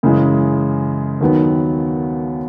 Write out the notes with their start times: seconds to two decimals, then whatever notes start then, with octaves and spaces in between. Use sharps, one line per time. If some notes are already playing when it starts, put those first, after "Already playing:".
0.03 F#2 C#3 E3 G#3
1.21 D#2 D#3 F#3 B3